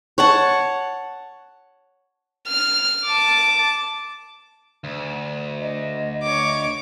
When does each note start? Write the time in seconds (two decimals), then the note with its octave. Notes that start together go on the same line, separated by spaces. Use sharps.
0.18 C#5 F#5 A5
2.48 F6
3.05 A5 D6
4.84 D2
5.61 D#5
6.23 C#5 D#5 D6